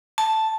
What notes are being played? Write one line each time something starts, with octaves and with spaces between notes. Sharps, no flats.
A5